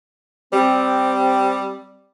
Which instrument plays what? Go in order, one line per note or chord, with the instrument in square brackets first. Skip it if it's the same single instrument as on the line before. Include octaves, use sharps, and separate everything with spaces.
[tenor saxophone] G3 [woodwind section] C4